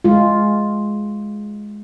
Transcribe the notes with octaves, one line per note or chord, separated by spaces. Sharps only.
G#3 F4